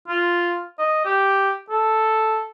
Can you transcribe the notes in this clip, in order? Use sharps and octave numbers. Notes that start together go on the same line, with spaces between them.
F4
D#5
G4
A4